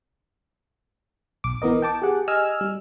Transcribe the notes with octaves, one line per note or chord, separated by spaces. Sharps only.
B1 D6
E3 B3 A#4 D#5
G5 A5 D6
G4 G#4 F#5
D#5 G#5 E6 F6
G3